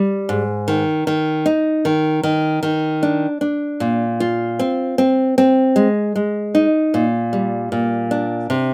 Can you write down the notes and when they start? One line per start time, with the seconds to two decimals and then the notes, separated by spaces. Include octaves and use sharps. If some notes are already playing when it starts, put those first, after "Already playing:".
Already playing: G3
0.29 G#2
0.68 D#3
1.07 D#3
1.46 D#4
1.85 D#3
2.23 D#3
2.63 D#3
3.03 D4
3.41 D4
3.80 A#2
4.20 F4
4.59 C4
4.98 C4
5.38 C4
5.76 G#3
6.16 G#3
6.55 D#4
6.94 A#2
7.33 G3
7.72 A#2
8.11 D4
8.50 C3